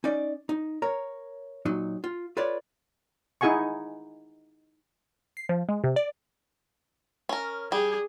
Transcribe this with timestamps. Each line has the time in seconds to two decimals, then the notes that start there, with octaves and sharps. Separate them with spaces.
0.04 C#4 D#4 D5
0.49 D#4
0.82 A#4 C#5 A#5
1.65 A#2 F#3 D#4
2.04 F4
2.37 F4 A4 B4 C#5 D5
3.41 D#4 E4 G#4 F#5 G#5 C#6
5.37 C7
5.49 F3
5.69 G#3
5.84 C3
5.96 D5
7.29 C#4 A#4
7.72 G3 G#4